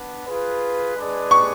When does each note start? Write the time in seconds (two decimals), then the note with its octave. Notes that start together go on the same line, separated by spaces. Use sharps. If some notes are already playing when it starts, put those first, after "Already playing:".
Already playing: B3 D4
0.26 F4 G#4 B4
0.96 G#3 D4 G#4 B4 D5
1.31 C#6